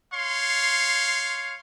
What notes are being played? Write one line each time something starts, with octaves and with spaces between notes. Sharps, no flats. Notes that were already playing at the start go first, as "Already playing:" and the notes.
C#5 F5 C6